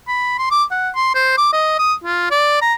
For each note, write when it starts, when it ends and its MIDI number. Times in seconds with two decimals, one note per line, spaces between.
0.08 0.38 83
0.39 0.47 84
0.51 0.64 86
0.71 0.89 78
0.95 1.14 84
1.15 1.34 72
1.38 1.48 86
1.53 1.75 75
1.79 1.94 87
2.04 2.27 65
2.31 2.58 74
2.61 2.74 82